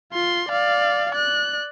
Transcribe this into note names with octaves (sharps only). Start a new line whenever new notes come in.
F4 C6
D5 F5
D5 F#6